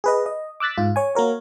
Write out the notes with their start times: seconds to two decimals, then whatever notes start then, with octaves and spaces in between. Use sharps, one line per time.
0.04 G#4 B4 D#5
0.26 D#5
0.60 D6 E6 F#6 A6 B6
0.78 G#2 F4
0.96 C#5 G#5
1.15 A#3 F#4 A#4 C#5